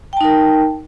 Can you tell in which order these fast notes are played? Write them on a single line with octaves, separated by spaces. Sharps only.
G5 A5 D#4 A#4